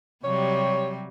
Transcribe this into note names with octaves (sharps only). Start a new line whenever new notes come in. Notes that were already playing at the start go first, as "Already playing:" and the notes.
C3 F#3 G3 C#5